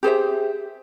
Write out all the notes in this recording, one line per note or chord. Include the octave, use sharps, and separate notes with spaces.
G4 G#4 C5 E5